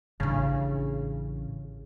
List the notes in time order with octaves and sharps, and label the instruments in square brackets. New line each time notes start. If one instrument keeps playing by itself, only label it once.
[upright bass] A1 D4 [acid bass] C#3